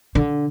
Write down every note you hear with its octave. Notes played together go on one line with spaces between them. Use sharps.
D3